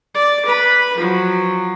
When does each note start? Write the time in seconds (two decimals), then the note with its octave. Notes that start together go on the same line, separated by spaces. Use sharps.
0.14 D5
0.46 B4 B5
0.98 F3 F#3